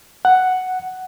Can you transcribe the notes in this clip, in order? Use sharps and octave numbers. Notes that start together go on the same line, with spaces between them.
F#5